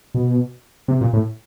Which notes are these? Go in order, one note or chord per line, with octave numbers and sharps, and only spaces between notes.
B2
C3
A#2
A2